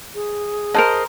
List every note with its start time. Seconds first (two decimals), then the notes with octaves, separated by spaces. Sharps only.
0.15 G#4
0.74 A#4 C5 D#5 F#5 A5